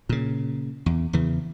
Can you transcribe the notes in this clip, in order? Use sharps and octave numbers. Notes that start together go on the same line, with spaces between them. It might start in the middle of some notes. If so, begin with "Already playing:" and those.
A#2 C#3
E2
E2 C#3 E3